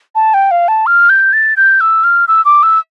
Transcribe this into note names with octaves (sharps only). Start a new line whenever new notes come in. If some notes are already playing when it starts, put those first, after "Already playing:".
A5
G5
F5
A5
F6
G6
A6
G6
E6
F6
E6
D6
E6